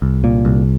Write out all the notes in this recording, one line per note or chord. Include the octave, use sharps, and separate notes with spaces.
C2
A#2
C2